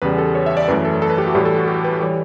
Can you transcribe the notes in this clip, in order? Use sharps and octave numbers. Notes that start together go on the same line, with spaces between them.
E2 C#3 G3 B4
A4
C#5
E5
D5
F#2 E3 A3 B4
A4
A4
B4
G4
F#4
A2 E3 G3 G4
A4
F#4
G4
B4
E3 G3 C#5